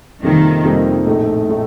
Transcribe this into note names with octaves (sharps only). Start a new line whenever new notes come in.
F2 C3 D#3 G3 A#3 D#4
F2 C3 G3 A#3 D#4
A#1 A2 A3 D#4
A2 A3 D#4